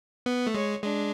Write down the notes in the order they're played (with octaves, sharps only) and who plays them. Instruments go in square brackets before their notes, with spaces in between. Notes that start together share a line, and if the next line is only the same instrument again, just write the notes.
[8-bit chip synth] B3
A3
[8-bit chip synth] G#3 [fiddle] C#5
[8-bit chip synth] G#3 [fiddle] D4